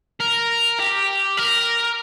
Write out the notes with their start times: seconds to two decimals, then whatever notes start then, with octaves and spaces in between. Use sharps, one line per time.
0.20 A#4
0.79 G4
1.37 A#4